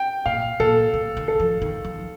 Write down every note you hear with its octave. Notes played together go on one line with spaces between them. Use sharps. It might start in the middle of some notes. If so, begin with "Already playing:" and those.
Already playing: G5
A#2 F5
A#2 A4
D3
D#3
A4
F3
D#3
F3